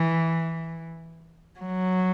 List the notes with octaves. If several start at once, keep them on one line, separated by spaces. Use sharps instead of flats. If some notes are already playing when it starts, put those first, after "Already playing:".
Already playing: E3
F#3